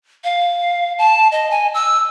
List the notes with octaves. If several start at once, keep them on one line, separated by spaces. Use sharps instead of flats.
F5
A5
D#5
G#5
E6